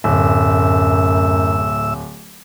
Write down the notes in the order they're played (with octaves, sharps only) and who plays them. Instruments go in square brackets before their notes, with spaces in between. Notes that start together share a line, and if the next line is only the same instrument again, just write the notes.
[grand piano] D1 [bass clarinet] F#2 [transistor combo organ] A2 E5 E6